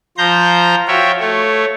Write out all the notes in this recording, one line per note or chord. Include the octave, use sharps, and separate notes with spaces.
F3 C5 A#5 G6
F4 F#4 C#5 E5 G5
A3 C#5